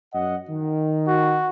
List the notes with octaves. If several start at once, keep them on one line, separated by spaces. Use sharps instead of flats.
F#2 D#5 F#5
D#3
F#4